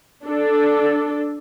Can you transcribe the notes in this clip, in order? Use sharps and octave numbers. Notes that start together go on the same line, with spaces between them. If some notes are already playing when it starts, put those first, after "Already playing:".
D4 A4